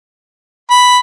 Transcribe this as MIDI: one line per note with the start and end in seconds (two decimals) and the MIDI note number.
0.70 0.98 83